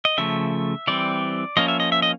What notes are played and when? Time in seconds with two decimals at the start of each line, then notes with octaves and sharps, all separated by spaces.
0.05 D#5
0.18 C#3 F3 A3 E5
0.87 E3 G3 C4 D5
1.57 F3 A#3 C#4 D#5
1.68 E5
1.80 D#5
1.92 E5
2.02 D#5